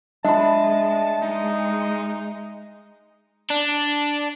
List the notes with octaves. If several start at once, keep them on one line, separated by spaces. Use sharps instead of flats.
G#3 D4 D#5 E5 A5 B5
G#3 D#4
D4